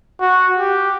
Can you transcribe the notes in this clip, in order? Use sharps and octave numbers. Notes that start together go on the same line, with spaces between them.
F#4
G4